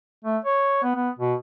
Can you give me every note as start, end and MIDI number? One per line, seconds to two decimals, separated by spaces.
0.25 0.37 57
0.45 0.80 73
0.83 0.93 59
0.96 1.10 59
1.19 1.34 47